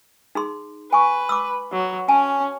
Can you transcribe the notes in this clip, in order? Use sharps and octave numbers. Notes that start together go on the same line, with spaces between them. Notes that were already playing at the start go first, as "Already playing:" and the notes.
D#4 G#4 C6
B4 G#5 C#6
D6 E6
F#3
C#4 G#5 A5